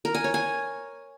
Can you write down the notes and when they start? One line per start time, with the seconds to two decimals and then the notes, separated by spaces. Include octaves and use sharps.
0.05 A#4
0.15 G#5
0.24 C#5
0.34 G#5